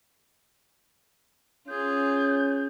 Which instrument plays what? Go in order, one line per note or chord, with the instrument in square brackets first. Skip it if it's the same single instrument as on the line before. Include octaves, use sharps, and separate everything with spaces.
[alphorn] C#4 [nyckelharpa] F4 G#4 [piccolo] G6